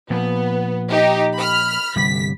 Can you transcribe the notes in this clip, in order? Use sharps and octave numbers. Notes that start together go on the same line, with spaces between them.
A#2 F3 B3
D#4 G4
B5 F6
G1 C3 G3 B6